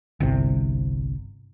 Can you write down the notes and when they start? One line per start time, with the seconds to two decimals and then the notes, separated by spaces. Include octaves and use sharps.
0.20 G1 C2 C3